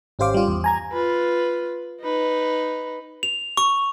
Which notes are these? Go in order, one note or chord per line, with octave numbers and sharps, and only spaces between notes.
G#1 C#4 G4 C5 F5 D6
G3 F4
E2
G#5 A#5 G#6
F4 B4
D#4 B4
F7
C#6